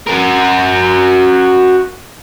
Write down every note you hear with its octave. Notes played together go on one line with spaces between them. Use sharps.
F#4 A#4